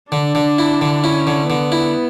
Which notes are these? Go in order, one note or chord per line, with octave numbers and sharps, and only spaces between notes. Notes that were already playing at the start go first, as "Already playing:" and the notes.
D3 D4
D3
E4
D3
C#4 E4
D3
D3 B3
E4